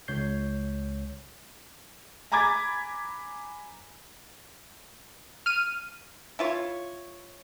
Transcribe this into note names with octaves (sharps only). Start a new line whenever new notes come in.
C#2 C#5 G6 C7
G#5 A#5 B5 D6 G#6 A6
F6 D#7
E4 F4 C#5